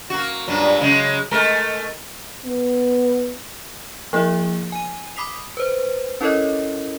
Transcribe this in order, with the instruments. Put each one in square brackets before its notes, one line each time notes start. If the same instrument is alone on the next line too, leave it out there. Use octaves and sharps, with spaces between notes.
[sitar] A#3 F#4
G2 A#2 F#3
C#3 F#3 G#3
G#3 A3 A#4
[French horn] B3
[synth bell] F3 A#3 E4 G#4 E5
G#5 D#7
B5 D6 D#6 B6 C7 F7
B4 C5
C#4 E4 A4 A#4 C#5 D#5